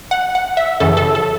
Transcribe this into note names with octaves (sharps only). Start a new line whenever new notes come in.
F#5
F#5
E5
F#2 C#3 E3 A4
A4
A4